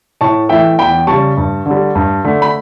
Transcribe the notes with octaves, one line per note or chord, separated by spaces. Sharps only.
A2 A5 C#6
E3 A3 E5 G5
E2 G5 B5
C#3 G3 A5 C#6
G2
D3 G3
G2
D3 A3
B5